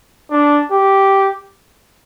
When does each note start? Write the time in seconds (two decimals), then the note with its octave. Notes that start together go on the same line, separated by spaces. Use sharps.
0.31 D4
0.71 G4